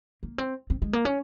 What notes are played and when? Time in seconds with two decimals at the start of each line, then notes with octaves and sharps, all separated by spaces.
0.23 A#3
0.38 C4
0.70 C4
0.82 G#3
0.93 A#3
1.05 C#4